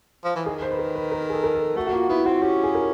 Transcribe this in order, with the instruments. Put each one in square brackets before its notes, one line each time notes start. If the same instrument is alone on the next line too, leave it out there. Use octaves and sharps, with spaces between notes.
[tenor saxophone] F3
E3
[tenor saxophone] D#3 [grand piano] G#4
[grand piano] C5
B4
A#4
B4
A#4
G#4
A4
A#4
A4
[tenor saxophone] A3 [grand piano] F#4
[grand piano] F#4
[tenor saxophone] A#3 [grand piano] F4
[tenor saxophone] B3 [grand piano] E4
[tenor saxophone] C4 [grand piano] F#4
[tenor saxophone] C#4 [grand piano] G4
[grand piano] G#4
A#4